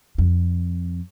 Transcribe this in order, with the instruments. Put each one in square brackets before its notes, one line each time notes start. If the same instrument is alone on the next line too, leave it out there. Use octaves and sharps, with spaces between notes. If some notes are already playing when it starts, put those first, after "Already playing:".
[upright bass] F2